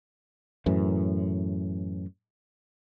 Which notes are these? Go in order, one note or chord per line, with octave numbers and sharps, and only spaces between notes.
F#2 A2 E3